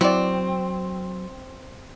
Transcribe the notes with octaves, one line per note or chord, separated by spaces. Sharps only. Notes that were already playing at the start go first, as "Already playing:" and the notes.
F#3 C4 E4 D5